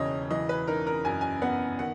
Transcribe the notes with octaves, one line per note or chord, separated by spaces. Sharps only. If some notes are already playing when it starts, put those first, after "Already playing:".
Already playing: E1 D#2 C#3 E3 C#5 D#5
E3 D#5
B4
D#4 A#4
A#4
F#2 G#5
G#5
B3 F#5
D#3 F#5